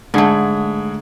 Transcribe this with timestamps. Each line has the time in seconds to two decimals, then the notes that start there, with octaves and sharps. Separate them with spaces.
0.14 G#2 D3 A3 G#4